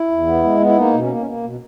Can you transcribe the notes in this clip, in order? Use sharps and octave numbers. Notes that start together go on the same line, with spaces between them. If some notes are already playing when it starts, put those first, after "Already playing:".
Already playing: E4
E2
B3
G#3
B3
E4
A#3 D#4
B2
C#4
A#3
C#4
A#3
B2